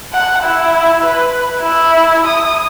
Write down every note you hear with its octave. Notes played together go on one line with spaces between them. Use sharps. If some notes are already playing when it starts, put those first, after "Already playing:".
F#5
E4
B4
E4
D#6